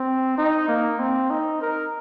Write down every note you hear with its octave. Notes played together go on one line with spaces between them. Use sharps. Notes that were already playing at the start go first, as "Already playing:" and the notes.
Already playing: C4
D#4
A#3
C4
D#4
A#4